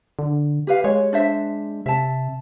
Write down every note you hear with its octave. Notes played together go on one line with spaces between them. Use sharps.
D3
G4 B4 F5
G#3 C#5
D4 C5 E5
C3 E5 A5